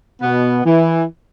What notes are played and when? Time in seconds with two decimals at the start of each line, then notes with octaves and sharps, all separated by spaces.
0.22 B2 B3
0.66 E3